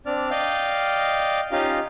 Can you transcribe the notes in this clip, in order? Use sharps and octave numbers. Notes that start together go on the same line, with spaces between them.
C4 D4 D5 F6
D5 D#5 F5 G5
C#4 D#4 F4 G4 D#5 F5